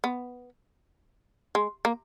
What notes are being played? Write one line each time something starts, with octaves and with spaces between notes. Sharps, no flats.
B3
G#3
A#3